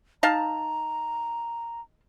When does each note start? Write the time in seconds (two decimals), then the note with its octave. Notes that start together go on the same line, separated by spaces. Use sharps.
0.23 D#4 F5 A5 A#5